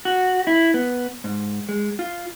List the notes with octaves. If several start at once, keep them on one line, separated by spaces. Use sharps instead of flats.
F#4
E4
B3
G#2
G#3
F4